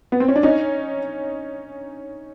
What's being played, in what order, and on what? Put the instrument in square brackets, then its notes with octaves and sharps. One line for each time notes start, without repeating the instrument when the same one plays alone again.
[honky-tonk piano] B3
C4
C#4
D4
C#4 D#4